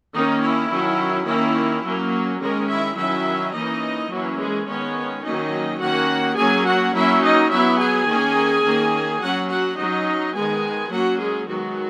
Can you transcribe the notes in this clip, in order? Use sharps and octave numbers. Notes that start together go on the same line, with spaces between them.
D#3 A#3 C#4 D#4
E4
D#3 F#3 C#4
D#3 A#3 C#4 E4
F#3 A#3 C#4
D#3 G#3 A#3 C#4 A#4
E4 E5
D#3 F#3 C#4 E4 E5
E3 A#3 C#4 D#4 D#5
E3 F#3 A#3 C#4 F#4
G#3 G#4
D#3 G#3 B3 C#4 C#5
D#3 F#3 A#3 C#4 D#4 D#5
D#3 A#3 C#4 F#4 F#5
F#3 A#3 C#4 G#4 G#5
F#4 F#5
F#3 A#3 C#4 E4 E5
D#4 D#5
F#3 B3 E4 E5
G#4 G#5
D#3 A#3 C#4
D#3 A#3 C#4
F#3 A#3 C#4 F#4 F#5
F#4 F#5
F#3 C#4 D#4 D#5
D#3 G#3 B3 G#4 G#5
F#3 A#3 C#4 F#4 F#5
G#3 G#4
D#3 F#3 G#3 B3 F#4